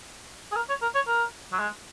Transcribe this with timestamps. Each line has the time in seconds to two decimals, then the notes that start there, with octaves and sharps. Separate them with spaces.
0.52 G#4
0.56 A#4
0.69 C#5
0.82 A#4
0.95 C#5
1.08 A#4
1.52 F#3
1.59 G#3